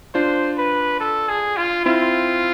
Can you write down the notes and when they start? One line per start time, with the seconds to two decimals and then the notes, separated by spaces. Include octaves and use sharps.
0.14 D4 F4 C5
0.58 B4
1.00 A4
1.29 G#4
1.57 F4
1.85 C4 E4 F4